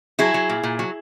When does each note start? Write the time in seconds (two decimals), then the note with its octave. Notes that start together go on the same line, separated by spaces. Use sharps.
0.19 F#3 E4 G#4
0.34 F#3
0.49 A#2
0.63 A#2
0.79 F#3